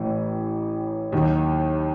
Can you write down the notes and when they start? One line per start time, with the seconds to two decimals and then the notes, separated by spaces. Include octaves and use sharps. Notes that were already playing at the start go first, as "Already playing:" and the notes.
Already playing: A1 A2 E3
1.12 D#2 D#3 F#3